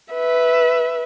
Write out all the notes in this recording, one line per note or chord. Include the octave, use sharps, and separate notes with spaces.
B4 E5